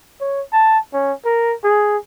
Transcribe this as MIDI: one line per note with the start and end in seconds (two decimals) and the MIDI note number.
0.20 0.41 73
0.53 0.78 81
0.93 1.13 61
1.25 1.54 70
1.64 1.97 68